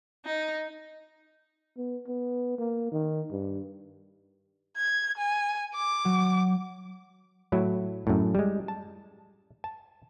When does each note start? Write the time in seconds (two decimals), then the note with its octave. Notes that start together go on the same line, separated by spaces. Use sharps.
0.25 D#4
1.77 B3
2.07 B3
2.59 A#3
2.92 D#3
3.32 G2
4.77 G#6
5.17 G#5
5.75 D6
6.05 F#3
7.52 A2 F#3 E4
8.07 F#2 A2
8.35 G3 G#3
8.68 A5
9.64 A5